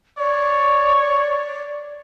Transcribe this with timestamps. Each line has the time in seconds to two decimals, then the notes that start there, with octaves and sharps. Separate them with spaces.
0.18 C#5 D5
1.01 D5